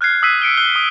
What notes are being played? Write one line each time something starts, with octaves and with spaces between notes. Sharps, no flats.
F6 F#6 G#6 C7
D#6 E6 F#6 B6 C7 D#7
B6 C#7 D7 G7
F#6 G7
D#6